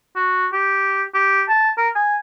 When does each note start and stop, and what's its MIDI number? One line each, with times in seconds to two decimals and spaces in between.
0.16 0.47 66
0.53 1.03 67
1.15 1.43 67
1.49 1.71 81
1.78 1.89 70
1.95 2.17 80